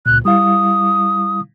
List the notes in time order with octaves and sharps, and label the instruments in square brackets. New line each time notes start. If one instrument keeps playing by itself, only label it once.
[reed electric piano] C#2 A#2 [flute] F#6
[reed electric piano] G3 E4 F5 [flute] D#6